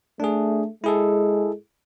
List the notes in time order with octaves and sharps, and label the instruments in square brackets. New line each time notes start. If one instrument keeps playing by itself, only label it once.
[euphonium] A3 [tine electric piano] D4 G#4
[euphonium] G#3 [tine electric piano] E4 G#4 A4